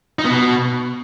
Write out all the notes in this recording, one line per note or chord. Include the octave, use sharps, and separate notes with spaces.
D#4
B3
B2